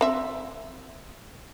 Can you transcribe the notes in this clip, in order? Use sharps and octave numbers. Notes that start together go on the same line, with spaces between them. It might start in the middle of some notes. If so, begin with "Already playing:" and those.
C4 E5